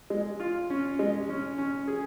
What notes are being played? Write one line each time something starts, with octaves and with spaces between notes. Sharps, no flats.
G#3
F4
C#4
G#3
C#4
C#4
G#4